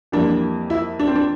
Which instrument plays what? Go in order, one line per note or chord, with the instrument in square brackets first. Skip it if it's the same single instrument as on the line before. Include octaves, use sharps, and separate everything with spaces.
[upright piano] F2 E3 G3 A#3 D4
E4
D4
C4
D4